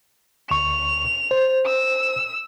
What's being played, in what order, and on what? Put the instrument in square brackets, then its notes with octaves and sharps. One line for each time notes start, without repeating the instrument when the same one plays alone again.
[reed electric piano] D2 C#6 [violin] F7
[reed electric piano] C5
[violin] E6